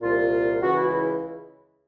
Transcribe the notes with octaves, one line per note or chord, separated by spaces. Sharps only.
C2 A#2 F4
C#2 C#3 E3 F#4
E4
E4